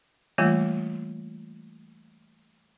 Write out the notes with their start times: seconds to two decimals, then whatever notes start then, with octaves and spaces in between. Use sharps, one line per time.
0.38 E3 G3 A3 A#3 F4